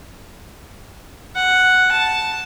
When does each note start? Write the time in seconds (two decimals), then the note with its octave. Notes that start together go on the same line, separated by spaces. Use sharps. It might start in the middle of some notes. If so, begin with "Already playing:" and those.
1.35 F#5
1.91 A5